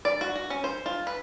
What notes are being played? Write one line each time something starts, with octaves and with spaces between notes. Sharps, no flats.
D5
F#4
F#4
C#4
C5
F4
B4